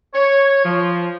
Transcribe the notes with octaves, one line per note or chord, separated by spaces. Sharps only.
C#5
F3